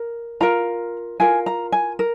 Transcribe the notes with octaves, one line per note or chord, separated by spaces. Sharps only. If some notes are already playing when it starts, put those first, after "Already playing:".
Already playing: A#4
F4 A#4 A#5
F4 A#4 G#5
A#5
G#5
A#4